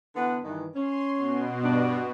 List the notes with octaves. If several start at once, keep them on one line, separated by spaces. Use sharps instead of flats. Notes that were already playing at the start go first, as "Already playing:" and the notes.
D3 E3 B3
G2 D#3 E3
C#4 C6
B2
G2 D4